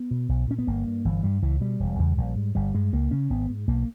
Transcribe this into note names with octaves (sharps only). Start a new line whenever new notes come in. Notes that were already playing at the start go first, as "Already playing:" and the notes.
Already playing: B3
B2
B1
A#2 C#4
B3
G1 A#3
G2
G1 E3
G2 G3
C#2 E3
B2 G3
E1
E2 C#3
A#1
G#2
G1 G3
G2 G#3
C#2 A#3
C#3 C#4
G#1 B3
G#2
B1 A#3